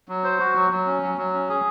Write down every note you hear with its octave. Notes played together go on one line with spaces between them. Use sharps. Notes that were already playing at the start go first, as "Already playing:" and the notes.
F#3
C5
F#4
F#3
F#3
C#4
F#3
F#3
C#4
G#4